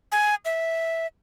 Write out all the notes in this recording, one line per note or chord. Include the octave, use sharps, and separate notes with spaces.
G#5
E5